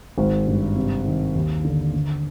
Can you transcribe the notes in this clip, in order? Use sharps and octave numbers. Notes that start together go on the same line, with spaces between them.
G#1
G2
C3
D#3
D#2
D3
D3